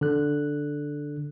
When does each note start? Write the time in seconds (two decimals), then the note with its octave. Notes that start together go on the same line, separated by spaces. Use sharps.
0.01 D3 F#6